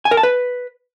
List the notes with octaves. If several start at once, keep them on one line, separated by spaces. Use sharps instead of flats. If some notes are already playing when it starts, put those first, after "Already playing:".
G#5
A#4
A5
B4